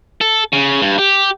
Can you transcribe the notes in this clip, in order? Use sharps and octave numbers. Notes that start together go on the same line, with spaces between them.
A4
C#3
G2
G4